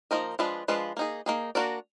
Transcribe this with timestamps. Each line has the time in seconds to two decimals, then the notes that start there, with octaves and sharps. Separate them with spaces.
0.11 F3 A#3 D#4 A#4 D#5
0.39 F3 G#3 D4 F4 B4
0.68 F3 G#3 D4 F4 B4
0.97 A#3 D#4 G#4
1.26 A#3 D#4 G#4
1.55 A#3 D4 F#4 A#4 D5